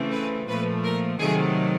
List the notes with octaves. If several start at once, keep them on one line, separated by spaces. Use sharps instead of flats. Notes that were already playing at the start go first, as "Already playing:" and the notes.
Already playing: C#3 E3 A3 C4
B4
A#2 F3 A3 B4
A#4
C3 D#3 F#3 A3 G#4